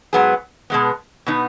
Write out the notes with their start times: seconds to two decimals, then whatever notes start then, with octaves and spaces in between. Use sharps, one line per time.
0.13 G#2 F#3 B3 G#4
0.70 B2 G#3 B3
1.26 B2 B3 D#4